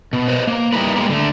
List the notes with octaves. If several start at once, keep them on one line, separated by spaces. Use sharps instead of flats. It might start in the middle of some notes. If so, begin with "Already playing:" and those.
B2
B4 C5 D#5
A#3
G3 D#4 E4 A#4 B4
G3 G#3 A#3
D3 A3